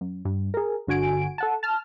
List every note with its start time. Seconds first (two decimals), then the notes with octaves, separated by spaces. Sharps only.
0.01 F#2
0.25 G2
0.54 G#4 A#4
0.87 G1 D3 F#4 G#5 D7
1.38 A4 F#5 A5
1.63 A5 F6